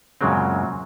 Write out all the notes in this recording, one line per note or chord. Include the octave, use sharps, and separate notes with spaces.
F#2 A#2 C#3 F#3 G#3 C4